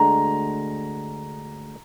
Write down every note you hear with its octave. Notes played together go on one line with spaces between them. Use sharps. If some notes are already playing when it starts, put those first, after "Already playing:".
Already playing: D2 D3 G#3 A#5